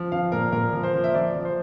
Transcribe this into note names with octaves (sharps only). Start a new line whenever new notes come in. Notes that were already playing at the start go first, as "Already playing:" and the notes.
Already playing: F3
F3 F5
A#2 A#4
A#2 A#4
F3
C5
F3
E5
F3 D5
F3
C5